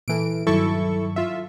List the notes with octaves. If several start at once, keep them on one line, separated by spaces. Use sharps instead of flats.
A#2 E3 A4 D7
G2 D#3 F#3 E4 A4 C#6
F4 E5